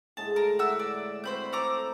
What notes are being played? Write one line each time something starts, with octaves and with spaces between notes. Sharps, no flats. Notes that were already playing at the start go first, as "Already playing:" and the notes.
A2 D3 G#3 A5
A#4
F#4 E5 E6
D5
C4 F#4 C5 B5 G6
A4 A#5 D6